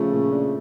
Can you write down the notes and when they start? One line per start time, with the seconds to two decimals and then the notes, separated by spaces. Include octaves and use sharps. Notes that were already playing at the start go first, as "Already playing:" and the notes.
Already playing: C#3 F3 A3
0.12 A#2
0.32 D4